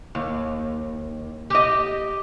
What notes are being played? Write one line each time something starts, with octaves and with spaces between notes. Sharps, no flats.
D#2
G4 D#5